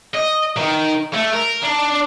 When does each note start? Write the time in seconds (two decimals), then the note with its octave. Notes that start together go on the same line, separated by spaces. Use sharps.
0.14 D#5
0.57 D#3
1.14 A3
1.33 A#4
1.63 D4